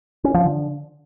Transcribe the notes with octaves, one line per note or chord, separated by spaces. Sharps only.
C#4
F3
D3